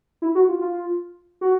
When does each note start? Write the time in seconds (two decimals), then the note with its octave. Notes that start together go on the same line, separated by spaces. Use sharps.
0.22 E4
0.35 F#4
0.49 F4
0.61 F4
1.41 F#4